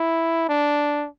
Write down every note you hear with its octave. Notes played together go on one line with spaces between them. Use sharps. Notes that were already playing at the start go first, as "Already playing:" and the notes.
Already playing: E4
D4